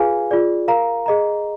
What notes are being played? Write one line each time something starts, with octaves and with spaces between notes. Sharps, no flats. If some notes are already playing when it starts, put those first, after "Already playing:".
Already playing: F4 G#4 B4 F5 G#5
F4 G#4 D5
A#4 F5 A#5
G#4 D#5 A#5